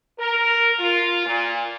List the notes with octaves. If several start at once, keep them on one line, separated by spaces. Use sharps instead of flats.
A#4
F4
A#2